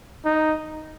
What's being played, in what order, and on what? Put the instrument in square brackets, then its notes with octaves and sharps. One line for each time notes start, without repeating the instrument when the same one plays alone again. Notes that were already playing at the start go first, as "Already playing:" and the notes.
[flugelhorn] D#4